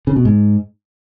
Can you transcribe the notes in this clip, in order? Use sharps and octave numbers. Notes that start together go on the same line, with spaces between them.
C#3
B2
G#2